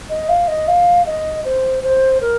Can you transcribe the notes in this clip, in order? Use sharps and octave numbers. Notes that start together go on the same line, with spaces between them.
D#5
F5
D#5
F5
D#5
C5
C5
A#4